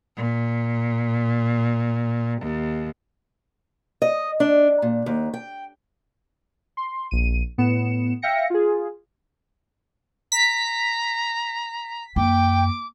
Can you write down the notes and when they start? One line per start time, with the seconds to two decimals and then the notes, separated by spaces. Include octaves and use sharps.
0.17 A#2
2.42 D#2
4.02 D#5
4.40 D4
4.82 A#2
5.06 D#2
5.34 G5
6.77 C6
7.11 A#1 D#7
7.58 A2 B3 C#7 E7
8.22 E5 F5 G5 A#6 C#7
8.50 F4 G#4
10.32 A#5 B6
12.16 F#2 A#3 G5 D6